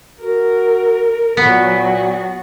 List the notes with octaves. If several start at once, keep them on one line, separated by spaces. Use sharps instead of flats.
F#4 A#4
A#2 F#3 B3 F#4